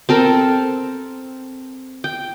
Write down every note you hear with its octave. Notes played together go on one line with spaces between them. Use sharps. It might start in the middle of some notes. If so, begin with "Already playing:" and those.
C4 A4 A#4
G5